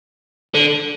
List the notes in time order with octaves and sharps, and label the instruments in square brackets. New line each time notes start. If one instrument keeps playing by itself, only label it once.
[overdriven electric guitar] D3